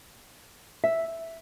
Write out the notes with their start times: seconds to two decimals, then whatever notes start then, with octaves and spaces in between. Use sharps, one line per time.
0.84 E5